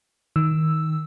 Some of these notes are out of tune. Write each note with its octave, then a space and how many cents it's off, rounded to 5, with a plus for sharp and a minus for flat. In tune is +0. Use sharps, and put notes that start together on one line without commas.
D#3 +15 E6 +0